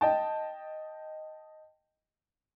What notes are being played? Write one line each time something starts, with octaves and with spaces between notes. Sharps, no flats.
D#5 G5 A5